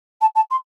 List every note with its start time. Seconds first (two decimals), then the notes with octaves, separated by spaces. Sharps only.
0.21 A5
0.35 A5
0.50 C6